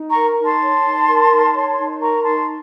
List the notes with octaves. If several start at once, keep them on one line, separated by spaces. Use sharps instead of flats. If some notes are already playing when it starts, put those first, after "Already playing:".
Already playing: D#4
A#5 C#6
A#4
D#4
A5 C6
C#5
D#4
A#4
D#4
C#5
D#4
A#4 A#5 C#6
D#4 A5 C6